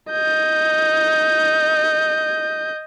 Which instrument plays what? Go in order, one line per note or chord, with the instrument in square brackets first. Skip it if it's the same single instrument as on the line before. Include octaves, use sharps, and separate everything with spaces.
[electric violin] D#5 G6